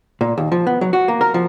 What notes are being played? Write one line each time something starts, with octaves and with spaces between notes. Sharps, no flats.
A#2
D#2
F3
B3
F#3
F#4
A#3
A#4
F3